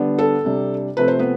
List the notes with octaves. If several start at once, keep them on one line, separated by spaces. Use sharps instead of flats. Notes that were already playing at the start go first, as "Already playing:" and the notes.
Already playing: D3 G3 B3 D4
A4
C3 G3 D4
C3 F3 A3 C4 B4
C5
B3 B4